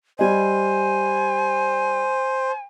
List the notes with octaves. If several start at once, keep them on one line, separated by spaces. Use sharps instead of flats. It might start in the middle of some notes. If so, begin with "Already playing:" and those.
G3 C5 D#5 G#5